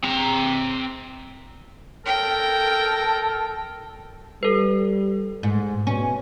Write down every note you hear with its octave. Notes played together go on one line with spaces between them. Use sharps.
C4 A#5
A4 A#4 G5
G3 A4 B4
G#2
B2 C#4